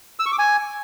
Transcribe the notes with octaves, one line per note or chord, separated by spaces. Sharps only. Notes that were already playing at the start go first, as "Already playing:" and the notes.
E6
C#6
D6
G#5